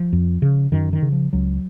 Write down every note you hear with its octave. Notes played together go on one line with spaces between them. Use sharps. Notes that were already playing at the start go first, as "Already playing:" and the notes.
Already playing: F3
F2
C#3
F#2 D#3
D#3
C#3
F3
C#2 F#3